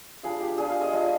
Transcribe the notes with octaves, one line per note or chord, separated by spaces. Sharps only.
G3 D4 F4 G#4
G4
G3 D4 F4 G#4
F5
D#5
G3 D4 F4 D#5